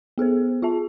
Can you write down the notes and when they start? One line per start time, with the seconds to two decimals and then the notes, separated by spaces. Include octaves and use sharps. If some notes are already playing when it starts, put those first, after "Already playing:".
0.18 B3 G#4 A4 C5
0.62 F4 G#4 E5 A5